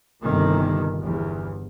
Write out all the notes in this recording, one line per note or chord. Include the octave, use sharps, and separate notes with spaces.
G1 C3 D#3
G1 E2